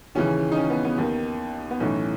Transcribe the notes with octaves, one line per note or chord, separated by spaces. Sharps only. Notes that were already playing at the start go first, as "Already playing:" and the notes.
D#2 C#3 E3 C#4
D#4
C#4
B3
B3
D#2 D#3
B3
B1 A2 E3 C#4